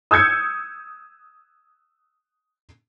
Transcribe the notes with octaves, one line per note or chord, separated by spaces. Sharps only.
D#6 E6 G6 G#6 C#7